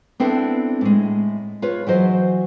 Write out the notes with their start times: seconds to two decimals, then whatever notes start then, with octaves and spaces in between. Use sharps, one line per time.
0.20 B3 C4 D4 E4 A4
0.81 A2 G#3
1.62 F4 B4 C#5
1.87 E3 F#3 C5 D#5